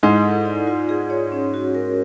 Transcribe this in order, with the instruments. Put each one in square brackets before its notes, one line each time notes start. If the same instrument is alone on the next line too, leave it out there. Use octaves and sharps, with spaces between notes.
[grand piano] G#2 G#3 [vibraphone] E4
[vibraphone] A4
D5
F4
G#4
C#5
C#4
F#4
A#4